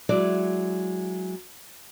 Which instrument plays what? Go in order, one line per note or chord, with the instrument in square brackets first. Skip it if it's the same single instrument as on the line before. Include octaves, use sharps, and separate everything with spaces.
[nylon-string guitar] F#3 G#3 E4 D5